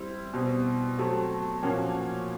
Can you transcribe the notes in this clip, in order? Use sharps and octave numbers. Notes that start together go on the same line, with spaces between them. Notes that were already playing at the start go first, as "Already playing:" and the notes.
Already playing: G3 C4 E4
B2 G3 C4
F#3 A3 C4
A#2 F3 A#3 C#4 F#4